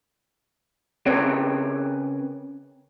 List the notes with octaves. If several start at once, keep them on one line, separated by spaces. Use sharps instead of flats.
C#3 C4 A#4 B4 C#5 G5